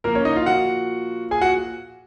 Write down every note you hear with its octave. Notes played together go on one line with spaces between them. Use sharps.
A#2 F3 A#3 A#4
C#4 C#5
D#4 D#5
F4 F5
F#4 F#5
G#4 G#5
F#4 F#5